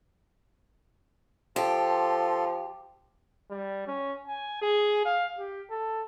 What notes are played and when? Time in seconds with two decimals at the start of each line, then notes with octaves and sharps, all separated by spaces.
1.56 F3 G4 A4 C6
3.51 G3
3.87 C#4
4.27 G#5
4.62 G#4
5.05 F5
5.38 G4
5.71 A4